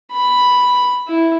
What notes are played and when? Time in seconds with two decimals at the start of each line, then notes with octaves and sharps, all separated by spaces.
0.12 B5
1.08 E4